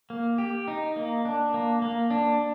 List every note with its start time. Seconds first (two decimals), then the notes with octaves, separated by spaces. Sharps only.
0.10 A#3
0.38 G4
0.68 D#4
0.96 A#3
1.25 D4
1.54 A#3
1.82 A#3
2.11 D4